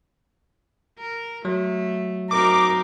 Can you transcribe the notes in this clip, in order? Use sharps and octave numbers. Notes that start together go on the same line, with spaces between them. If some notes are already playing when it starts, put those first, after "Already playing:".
A#4
F#3 A3
C4 D#4 F#4 A#4 D6